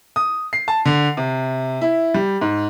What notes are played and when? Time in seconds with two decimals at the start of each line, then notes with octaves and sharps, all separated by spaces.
0.16 D#6
0.53 C7
0.68 A5
0.85 D3
1.17 C3
1.82 E4
2.14 G3
2.41 G#2